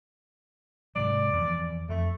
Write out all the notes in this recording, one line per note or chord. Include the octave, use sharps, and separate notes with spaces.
G#2 C3 F#3 D5
E2 F3
F2 A3